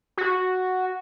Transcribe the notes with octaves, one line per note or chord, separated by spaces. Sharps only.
F#4